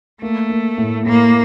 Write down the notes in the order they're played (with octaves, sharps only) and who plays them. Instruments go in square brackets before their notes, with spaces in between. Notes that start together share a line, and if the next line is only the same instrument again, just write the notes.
[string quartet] A3 [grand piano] A#3
[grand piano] A#3
A2
[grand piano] A2 [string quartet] A#3